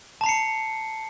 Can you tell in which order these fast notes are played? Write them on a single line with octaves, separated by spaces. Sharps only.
A5 A#5 C7 C#7